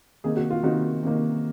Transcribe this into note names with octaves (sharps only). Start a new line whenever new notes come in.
C3 D#3 A#3 D#4 G#4
F#4
F4
C3 D#3 A#3 D#4 F#4
C3 D#3 A#3 D#4